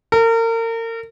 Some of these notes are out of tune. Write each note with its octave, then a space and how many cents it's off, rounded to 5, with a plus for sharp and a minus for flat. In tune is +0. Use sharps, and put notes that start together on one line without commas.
A#4 -35